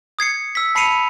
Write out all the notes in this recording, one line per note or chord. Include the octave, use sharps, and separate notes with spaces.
D#6 G#6 C7 C#7
E6 B6
A5 B5 C7 C#7 D#7 F7